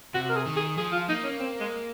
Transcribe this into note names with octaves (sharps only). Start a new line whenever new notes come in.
C3 F#4
A#4
G#4
D#3
G#4
F3 G#4
F4
A#3 D#4
C#4
C4
G#3